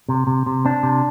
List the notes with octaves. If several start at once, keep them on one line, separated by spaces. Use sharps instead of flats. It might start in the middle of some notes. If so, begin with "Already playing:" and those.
C3
C3
C3
C4 D4
C3